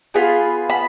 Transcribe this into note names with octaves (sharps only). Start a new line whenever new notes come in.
B3 F4 G#4 B5
B5